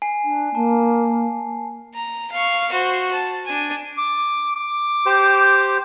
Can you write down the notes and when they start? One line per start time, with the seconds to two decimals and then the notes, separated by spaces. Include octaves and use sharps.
0.02 G#5 C7
0.24 D4
0.55 A#3 A5
1.94 A#5
2.32 F5 C#6
2.72 F#4 C5
3.12 A5
3.46 D4 G#5
3.98 D6
4.56 D6
5.06 G4 C5